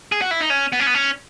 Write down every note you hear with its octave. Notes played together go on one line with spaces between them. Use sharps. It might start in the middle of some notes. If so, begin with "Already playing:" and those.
G#4
F#4
E4
D#4
C#4
B3
C#4
B3
C#4